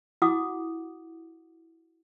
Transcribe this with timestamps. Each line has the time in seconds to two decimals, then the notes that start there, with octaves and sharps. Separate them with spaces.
0.22 E4 F#4 F#5 D6 D#6